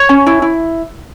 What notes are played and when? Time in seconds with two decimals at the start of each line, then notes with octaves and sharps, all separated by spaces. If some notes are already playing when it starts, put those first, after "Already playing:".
Already playing: C#5
0.09 C#4
0.26 E4
0.42 E4